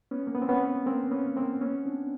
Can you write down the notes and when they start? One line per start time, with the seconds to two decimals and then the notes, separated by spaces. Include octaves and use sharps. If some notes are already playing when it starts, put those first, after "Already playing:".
0.11 B3 C#4
0.27 A#3
0.35 B3
0.42 C4
0.49 B3 C#4
0.86 A#3 C4
1.11 B3 C#4
1.36 A#3 C4
1.61 B3 C#4
1.86 C4 D4